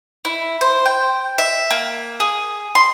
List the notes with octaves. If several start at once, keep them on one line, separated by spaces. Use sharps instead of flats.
E4
C5
G5
E5
A#3
G#4
C6